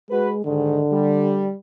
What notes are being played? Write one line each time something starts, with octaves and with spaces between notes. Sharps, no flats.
G#3 F#4 B4
G#2 D3 D#3
G3